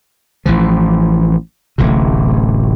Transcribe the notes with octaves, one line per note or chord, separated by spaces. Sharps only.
A1 E3 F3
D1 A1 C3